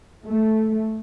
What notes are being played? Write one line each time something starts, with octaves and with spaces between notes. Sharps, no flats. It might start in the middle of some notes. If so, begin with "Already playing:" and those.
A3